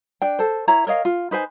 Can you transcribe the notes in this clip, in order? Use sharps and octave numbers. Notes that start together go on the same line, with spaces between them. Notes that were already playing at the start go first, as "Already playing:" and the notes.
D4 G5
A4 C5
E4 C#5 A#5
A#4 C#5 D#5 F5
F4
D#4 B4 C5 G#5